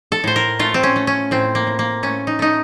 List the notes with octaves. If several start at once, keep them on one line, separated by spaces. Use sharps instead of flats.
A4
A2 C5
A#4
A3 F4
C4
C#4
A3
C#4
A2 C4
A#3
A2
A#3
A3 C#4
D#4
A3 D#4